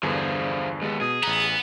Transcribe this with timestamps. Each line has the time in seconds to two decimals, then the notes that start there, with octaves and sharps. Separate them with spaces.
0.03 E2 G2 D3 F3 G#4
0.82 D#2 G#3 B3
1.01 B2 G#4 D#6
1.23 A1 B3 A#5